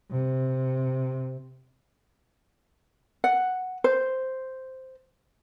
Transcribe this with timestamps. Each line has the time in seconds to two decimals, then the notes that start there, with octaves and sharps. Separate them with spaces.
0.11 C3
3.24 F#5
3.84 C5